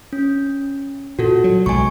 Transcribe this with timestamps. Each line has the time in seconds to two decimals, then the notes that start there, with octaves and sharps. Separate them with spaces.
0.13 C#4
1.19 A#2 F#4 A4
1.44 F#3
1.66 B1 B2 G#3 G#5 C#6